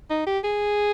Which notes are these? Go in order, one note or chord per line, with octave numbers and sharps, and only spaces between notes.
D#4
G4
G#4